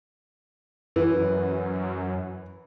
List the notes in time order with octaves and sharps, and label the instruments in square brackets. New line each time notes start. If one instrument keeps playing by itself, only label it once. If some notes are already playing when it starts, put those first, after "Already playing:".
[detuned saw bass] F#2 [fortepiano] E3